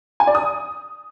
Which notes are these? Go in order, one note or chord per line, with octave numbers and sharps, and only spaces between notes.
G#5
D5
D#6